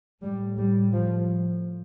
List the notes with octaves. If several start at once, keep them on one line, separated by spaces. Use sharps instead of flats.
A2 G3
G3
F3